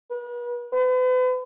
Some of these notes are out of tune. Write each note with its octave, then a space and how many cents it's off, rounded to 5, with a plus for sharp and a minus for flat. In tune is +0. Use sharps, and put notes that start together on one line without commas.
B4 -40
B4 +40